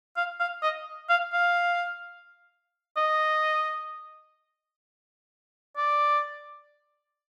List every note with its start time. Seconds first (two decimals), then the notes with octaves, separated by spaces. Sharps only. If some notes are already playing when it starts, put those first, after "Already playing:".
0.17 F5
0.40 F5
0.63 D#5
1.09 F5
1.33 F5
2.97 D#5
5.77 D5